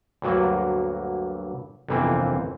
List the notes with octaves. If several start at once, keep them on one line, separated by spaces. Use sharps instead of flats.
D2 G2 F#3 A#3
G1 F2 C3 E3 A#3 C4